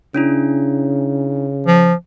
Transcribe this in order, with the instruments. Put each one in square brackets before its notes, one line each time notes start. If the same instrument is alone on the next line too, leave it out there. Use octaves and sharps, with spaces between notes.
[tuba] C#3 [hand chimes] C#4 D4 E4
[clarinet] F3